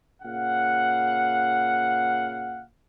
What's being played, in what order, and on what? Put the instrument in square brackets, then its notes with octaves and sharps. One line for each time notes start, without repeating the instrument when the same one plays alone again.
[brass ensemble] A#2 C#3 F5 F#5